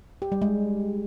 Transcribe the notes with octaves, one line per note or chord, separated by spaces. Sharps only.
G4
G3
G#3